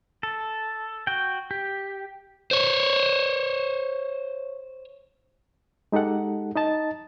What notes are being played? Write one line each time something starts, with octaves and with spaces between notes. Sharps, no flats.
A4
F#4 G5
G4
C5 C#5
G#3 D#4 G4 A4 F#5
D#4 D#5 A5 A6